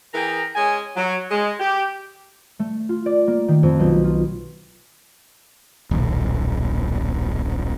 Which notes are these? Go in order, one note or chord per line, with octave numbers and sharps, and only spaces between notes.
E3 G#4 A#4 G5 A#5
G#3 C#4 G#5
F#3
G#3
G4
A3
F4
D5
A#3
D#3
F2
B1
F4
D#1 B1